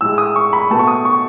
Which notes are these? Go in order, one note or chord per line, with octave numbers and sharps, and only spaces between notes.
A2 G#3 E6
D#6
C#6
B5
B2 A3 A5
C#6
D#6
C#6